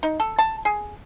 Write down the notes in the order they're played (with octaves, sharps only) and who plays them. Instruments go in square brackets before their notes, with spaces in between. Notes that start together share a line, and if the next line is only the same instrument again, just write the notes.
[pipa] D#4
A4
A5
G#4